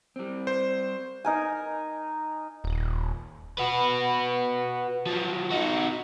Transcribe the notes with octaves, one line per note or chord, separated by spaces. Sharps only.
G3 C4
C5
D#4 A#4 G#5
D#1
F#4 B4
F3 F#3
D#4 F#4